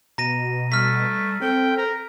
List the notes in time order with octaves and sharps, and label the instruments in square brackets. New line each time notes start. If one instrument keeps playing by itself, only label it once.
[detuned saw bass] B2 [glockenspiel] A#5 A#6 D#7
[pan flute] G3 [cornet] A3 [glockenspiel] F6 B6
[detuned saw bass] C4 [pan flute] A4 [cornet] G5
[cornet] A#4